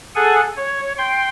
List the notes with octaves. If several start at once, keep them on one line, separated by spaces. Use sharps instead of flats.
G#4 A4 F#5 G#5
C#5
G5 C6